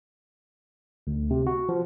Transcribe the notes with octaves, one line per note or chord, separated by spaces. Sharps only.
D2
C3
F#4
F3